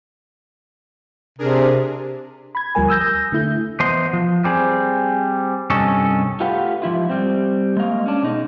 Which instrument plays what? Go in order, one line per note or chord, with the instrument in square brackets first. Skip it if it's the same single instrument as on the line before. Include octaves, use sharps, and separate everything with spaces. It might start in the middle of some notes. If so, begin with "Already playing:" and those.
[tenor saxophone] C3 [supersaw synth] D4 G#4 A#4
[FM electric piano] B5 G#6
D2 F3 G3 A#4 G#5
D#6 E6 G6 A#6
D3 A3 E4 G6
[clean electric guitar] E3 B3 C5 D#5 C6
F3
G3 C4 G#4
C2 G2 C#4 A4 D#5
[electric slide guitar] A3 F4 G4 B4 F5 F#5
G#2 F3 E4 F4
G3 C4
G#3 A#3 D#5 F5
C#4 D4
B2 G#3 D#4